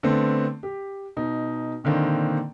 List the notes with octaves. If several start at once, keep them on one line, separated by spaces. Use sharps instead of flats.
D3 A3 B3 C4
G4
B2 D#4
A#2 D3 D#3 A#3 C4